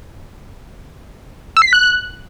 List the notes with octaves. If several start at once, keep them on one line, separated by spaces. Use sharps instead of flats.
E6
C7
B6
F#6